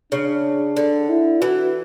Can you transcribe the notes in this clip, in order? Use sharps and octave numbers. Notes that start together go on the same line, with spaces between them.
C#3 D4
D3
E4
E3 F#4